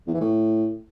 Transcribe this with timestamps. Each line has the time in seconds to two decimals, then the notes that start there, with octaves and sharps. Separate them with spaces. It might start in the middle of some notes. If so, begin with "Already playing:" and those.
0.07 E2
0.14 E3
0.21 A2